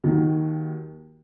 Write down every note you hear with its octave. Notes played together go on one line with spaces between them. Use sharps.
D#2 D#3 F#3